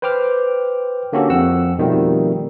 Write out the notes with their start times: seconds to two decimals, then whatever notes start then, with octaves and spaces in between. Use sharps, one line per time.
0.02 B4 C5 G5 D6 F6
1.13 D3 A#3 C#4 F#4 G4 A4
1.30 F2 C4 F#5 E6
1.78 B2 D#3 F3 G3 A3 C4